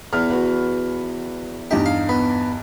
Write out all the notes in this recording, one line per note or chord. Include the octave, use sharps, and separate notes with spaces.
E2 F6
F#4 B4
E2 G2 D#4 G4
F5
B3